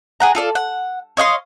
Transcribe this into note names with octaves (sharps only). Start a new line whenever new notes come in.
G#4 F#5 A#5
F4 A4 D5
F#5
C#5 D#5 F5 C6